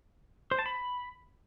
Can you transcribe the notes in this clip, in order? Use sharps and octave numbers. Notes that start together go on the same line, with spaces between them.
C5
A5
B5